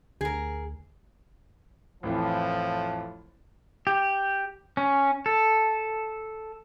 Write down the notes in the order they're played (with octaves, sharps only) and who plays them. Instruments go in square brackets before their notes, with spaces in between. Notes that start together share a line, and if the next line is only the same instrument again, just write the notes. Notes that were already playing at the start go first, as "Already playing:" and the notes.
[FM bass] D2 [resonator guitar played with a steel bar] G#4 A#4
[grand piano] A1 F2 E3 [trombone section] A2 F3
[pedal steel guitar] G4
C#4
A4